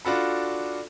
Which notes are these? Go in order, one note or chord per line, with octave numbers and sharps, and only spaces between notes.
D4 F4 F#4 A4 B5